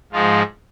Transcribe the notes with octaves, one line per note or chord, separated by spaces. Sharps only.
G#2 F3 G#3 F4